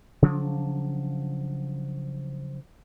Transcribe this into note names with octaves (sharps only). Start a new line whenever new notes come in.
C#3 F3 F#3 D4